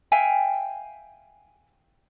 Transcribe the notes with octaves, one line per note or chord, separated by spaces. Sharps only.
E5 F5 G5 G#5